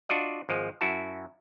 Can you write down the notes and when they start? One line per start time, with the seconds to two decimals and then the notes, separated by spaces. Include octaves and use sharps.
0.09 D4 F4 F#4 D5 D#5
0.49 G#1 F3 G#3
0.81 F#2 E4 F#4 A5